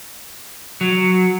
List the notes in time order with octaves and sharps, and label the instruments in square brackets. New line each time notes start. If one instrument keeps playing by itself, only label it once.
[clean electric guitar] F#3